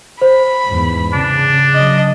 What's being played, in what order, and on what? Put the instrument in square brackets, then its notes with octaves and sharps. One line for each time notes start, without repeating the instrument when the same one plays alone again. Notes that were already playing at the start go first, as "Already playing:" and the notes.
[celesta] C5 [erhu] B5
[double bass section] E2 G#2
[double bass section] C#3 [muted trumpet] D4
[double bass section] C#3 F#3 [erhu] D#5